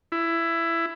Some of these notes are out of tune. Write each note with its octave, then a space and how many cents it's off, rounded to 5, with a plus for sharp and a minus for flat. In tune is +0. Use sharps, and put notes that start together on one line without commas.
E4 +15